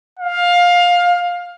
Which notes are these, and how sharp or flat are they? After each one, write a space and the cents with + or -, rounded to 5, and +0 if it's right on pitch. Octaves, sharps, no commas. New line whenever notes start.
F5 +15